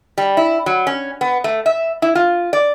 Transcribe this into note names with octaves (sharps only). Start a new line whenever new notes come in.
G3
E4
F#3
C#4
B3
A3
E5
E4
F4
D5